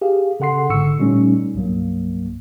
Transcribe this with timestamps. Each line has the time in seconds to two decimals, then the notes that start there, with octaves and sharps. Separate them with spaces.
0.02 G4 G#4 F5
0.40 C#3 A4 F#5 C6 C7
0.69 G#1 G#2 D3 C#6 E6 C#7
0.99 A#2 G3 A3 C#4 D#4
1.54 C2 G2 F#3 A#3